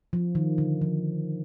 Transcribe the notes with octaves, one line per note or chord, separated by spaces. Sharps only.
F3
D#3
D3
F3